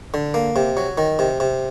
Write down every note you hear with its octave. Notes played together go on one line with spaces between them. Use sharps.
D3
A#3
C3
F#3
D#3
C3
C3